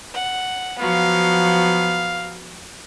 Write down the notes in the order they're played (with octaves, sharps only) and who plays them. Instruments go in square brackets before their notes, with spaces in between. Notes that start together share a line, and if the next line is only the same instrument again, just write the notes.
[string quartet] F#5
[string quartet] F3 F#3 B3 [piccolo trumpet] F5